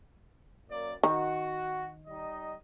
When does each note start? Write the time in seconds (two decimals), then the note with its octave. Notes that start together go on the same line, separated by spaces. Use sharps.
0.69 F#2 A#3 D5
1.03 D#3 F#4
2.07 G3 D#4 D#5